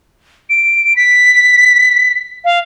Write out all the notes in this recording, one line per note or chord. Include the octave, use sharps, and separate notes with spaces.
D7
B6
F5